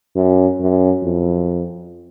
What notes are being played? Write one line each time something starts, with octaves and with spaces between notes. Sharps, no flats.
F#2
F#2
F2